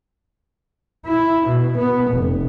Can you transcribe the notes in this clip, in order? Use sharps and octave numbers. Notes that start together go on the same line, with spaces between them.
E4
B2
B3
F1